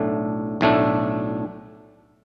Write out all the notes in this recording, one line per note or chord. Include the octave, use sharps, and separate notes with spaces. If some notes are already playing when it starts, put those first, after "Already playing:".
Already playing: B1 A2 A3 D4
B1 A2 A3 D4